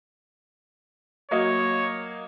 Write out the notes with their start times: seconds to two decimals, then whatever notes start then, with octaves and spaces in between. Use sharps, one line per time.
1.31 F#3 A#3 C#5 D#5